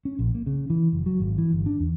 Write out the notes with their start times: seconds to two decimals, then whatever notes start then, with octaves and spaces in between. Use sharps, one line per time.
0.05 C#4
0.19 A#1
0.35 A#3
0.46 C#3
0.70 E3
0.93 F#1
1.06 F#3
1.20 G#1
1.38 E3
1.52 G1
1.66 D4
1.79 E2